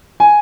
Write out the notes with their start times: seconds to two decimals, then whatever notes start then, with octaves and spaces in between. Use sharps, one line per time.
0.20 G#5